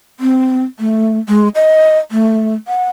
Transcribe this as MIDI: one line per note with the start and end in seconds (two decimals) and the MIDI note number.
0.20 0.64 60
0.79 1.19 57
1.29 1.48 56
1.55 1.98 75
2.11 2.53 57
2.68 2.89 78